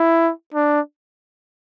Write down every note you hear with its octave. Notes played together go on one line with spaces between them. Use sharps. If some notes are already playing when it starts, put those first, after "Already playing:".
Already playing: E4
D4